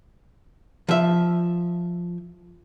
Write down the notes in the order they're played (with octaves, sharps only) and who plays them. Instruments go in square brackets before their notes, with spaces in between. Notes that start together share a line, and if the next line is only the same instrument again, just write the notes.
[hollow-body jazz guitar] F3 E5